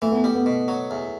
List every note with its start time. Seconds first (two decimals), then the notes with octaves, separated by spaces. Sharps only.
0.02 E3 A3
0.12 B3
0.24 G3 A3
0.35 B3
0.46 B2
0.68 F#3
0.91 E2